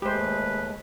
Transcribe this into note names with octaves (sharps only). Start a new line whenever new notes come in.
D#2 G#3 A3 G4 B4 C5